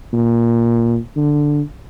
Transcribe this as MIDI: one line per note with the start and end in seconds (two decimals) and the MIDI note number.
0.13 0.97 46
1.16 1.61 50